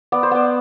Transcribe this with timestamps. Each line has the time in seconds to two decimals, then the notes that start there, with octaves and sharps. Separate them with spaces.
0.12 B3 D5
0.23 C5
0.31 B3 D5